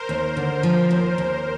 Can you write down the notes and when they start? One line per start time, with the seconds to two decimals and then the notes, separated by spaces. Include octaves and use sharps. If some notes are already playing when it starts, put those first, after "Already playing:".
Already playing: A#4 C5
0.09 D#2
0.37 D3
0.63 F3
0.91 D#2
1.18 D#2